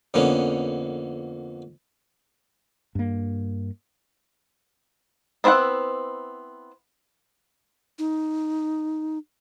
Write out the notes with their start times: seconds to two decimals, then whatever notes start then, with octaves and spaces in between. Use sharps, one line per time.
0.14 F2 D3 A#3 B3 C#4
2.95 G2 A#3
5.44 B3 C4 E4 D#5 F#5
7.99 D#4